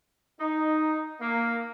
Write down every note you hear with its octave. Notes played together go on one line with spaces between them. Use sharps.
D#4
A#3